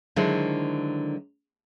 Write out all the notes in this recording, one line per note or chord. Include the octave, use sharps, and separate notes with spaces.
D3 D#3 F#3 G#3 E4 C5